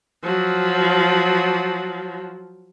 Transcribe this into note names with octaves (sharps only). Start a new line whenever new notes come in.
F3 F#3